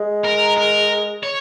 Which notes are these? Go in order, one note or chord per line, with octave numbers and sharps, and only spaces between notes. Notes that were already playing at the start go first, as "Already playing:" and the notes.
Already playing: G#3
A#4
A#4
C#5